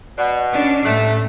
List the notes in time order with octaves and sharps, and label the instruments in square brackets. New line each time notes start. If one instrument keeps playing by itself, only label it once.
[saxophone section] B2 [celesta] D5 F#5 F#6
[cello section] C#4 D4
[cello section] A2 [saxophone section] C3 A3 [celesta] F#6 B6